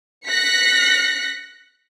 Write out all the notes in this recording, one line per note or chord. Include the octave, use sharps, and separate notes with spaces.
F#6 A#6 B6 C#7